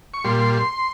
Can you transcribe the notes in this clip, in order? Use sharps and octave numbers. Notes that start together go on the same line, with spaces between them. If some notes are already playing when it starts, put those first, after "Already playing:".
C#6
A#2 G3 C6